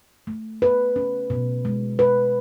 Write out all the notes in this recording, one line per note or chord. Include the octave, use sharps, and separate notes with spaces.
A3
B4
C#4
B2
G#3
B4